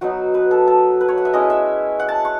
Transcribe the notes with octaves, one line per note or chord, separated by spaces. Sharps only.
F#3 B3 D#4 F#4
B4
A4
A4
B4
C#5
F#5
E5
G#3 C#4 E4 D#5
E5
F#5
A5
C#6